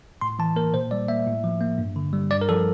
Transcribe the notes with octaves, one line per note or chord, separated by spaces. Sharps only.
A2 C6
E3 A5
A#3 A#4
A#2 C5
G3 D5
A#3 E5
A2
F3
A#3
G2
D3
G3
G2 D5
A#4
F3 A4